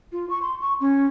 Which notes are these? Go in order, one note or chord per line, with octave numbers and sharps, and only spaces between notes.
F4
C#6
C6
C#6
C#4